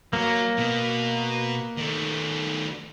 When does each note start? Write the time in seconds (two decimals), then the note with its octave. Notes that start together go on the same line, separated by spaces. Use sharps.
0.13 F#3 A#3
0.57 B2
1.77 D#3 A3